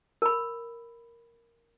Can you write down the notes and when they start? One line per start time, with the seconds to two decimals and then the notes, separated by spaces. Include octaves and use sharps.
0.22 A#4 B5